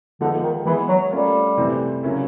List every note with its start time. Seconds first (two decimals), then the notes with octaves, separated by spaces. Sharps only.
0.21 D3 F3 G#3 B3 D#4
0.43 D#3
0.66 E3 G#3 B3 E4 G#4
0.89 F#3
1.12 G3 A3 C#4 F4 A#4
1.57 C3 E3 A3 C4
2.03 C#3 F#3 A#3 C#4 E4